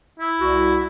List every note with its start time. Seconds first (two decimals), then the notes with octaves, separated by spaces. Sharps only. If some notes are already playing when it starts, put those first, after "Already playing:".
0.20 E4
0.39 C2 F#4